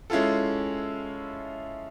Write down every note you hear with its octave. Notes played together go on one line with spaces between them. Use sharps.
G#3 C#4 E4 F4 A4